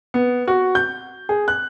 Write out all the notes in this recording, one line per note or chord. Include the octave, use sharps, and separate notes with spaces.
B3
F#4
G6
G#4
F#6